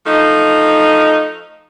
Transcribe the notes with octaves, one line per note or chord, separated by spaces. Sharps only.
F3 A3 D#4